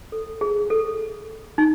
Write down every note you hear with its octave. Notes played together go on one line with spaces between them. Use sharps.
A4
G#4
A4
D#4